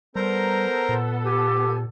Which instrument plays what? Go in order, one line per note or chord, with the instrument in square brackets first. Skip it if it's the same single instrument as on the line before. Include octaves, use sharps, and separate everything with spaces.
[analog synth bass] G3 [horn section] B3 A4 [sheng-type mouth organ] A#4 C5 A#5
[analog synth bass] A#2
[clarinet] G4 [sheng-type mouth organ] G#5